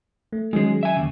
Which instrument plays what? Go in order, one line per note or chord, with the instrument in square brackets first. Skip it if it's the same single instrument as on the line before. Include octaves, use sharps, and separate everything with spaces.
[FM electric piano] A3
[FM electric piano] D#3 F#3 C#4 [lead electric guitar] G#3 G#4
[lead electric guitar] E5 G#5
D#2 C#3